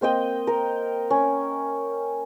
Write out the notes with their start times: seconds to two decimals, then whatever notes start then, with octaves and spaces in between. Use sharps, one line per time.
0.01 A#3 C4 D#5 G5
0.47 A#4
1.10 C#4